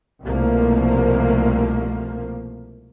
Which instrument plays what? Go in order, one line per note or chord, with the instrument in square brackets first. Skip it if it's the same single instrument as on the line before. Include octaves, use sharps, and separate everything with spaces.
[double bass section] C2 B2 F3 A3 A#3